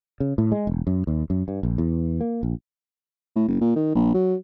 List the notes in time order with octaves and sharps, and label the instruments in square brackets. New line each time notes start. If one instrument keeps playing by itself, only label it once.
[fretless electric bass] C#3
A2
G#3
E1
F#2
D#2
F#2
G2
A#1
E2
A#3
A#1
[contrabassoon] A2
F#1
A#2
D#3
A#1
F#3